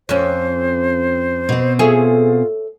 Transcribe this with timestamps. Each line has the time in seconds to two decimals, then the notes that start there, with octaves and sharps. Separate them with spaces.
0.09 F2 C#4 C5
1.49 B2 C4
1.79 F4 G#4 A4 C#5 E5